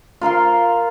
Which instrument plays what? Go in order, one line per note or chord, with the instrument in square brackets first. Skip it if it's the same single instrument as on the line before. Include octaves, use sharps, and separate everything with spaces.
[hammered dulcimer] F4 A#4 F5 C6